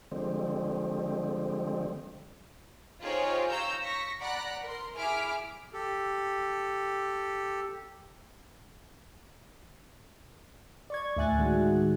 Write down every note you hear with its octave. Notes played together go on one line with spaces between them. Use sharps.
D3 F3 G3 G#3 C4
D#4 F4 G4 G#4 C5 C#5
C#5 F5 A#5 E6 G6
C#6 A#6 B6
D5 F#5 A#5 B5 F#6
A#4 C6
E4 G#4 D6 F6 B6 D7
G4 A4
D5 C#6 G#6
D2 A2 E5 G#5 F#6 A6
A2 D#3 G#3 F#4